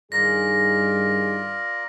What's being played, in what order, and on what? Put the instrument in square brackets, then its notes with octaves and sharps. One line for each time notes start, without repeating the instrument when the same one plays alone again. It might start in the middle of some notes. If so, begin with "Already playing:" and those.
[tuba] G2 [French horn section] D#3 G#4 [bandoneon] F4 A#4 D5 [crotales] A#6